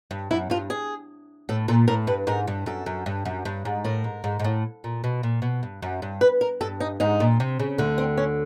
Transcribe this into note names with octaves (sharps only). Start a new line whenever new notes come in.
G2
F#2 E4
G2 F4
G#4
A2 A4
A#2 A4
A2 A#4
G2 B4
G#2 A#4
G2
F#2 A4
F#2
G2
F#2
G2
G#2
A2 A#4
G#2
G#2
G#2
A2
A#2
B2
A#2
B2
G2
F#2
G2
B4
A#4
G2 A4
D#4
G#2 D#4
A#2
C3
C#3
D2 D3
C4
C#4